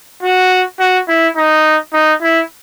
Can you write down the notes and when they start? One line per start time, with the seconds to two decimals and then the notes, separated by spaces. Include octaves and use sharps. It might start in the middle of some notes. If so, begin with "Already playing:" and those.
0.23 F#4
0.79 F#4
1.08 E4
1.36 D#4
1.93 D#4
2.22 E4